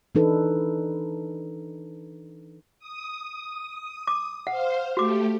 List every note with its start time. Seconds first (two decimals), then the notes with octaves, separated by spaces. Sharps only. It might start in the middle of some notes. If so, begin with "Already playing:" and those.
0.15 E3 D4 D#4 A4 B4
2.79 D#6
4.07 D6
4.47 C5 F5 F#5
4.97 A3 F#4 G4 D6